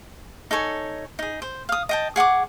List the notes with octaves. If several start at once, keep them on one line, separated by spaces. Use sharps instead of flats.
D#4 A4 C#5 G#5
D#4 G#4
C5
F5 D#6
D#5 G5 A5
G#4 F#5 C#6 D6